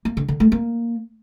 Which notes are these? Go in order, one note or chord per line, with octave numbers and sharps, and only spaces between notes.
A#3
D3
D3
A3
A#3